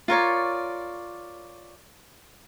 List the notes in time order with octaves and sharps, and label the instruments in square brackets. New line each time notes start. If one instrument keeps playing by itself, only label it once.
[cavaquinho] F4 A#4 C#5 D5